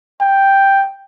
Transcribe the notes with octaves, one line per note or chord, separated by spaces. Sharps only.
G5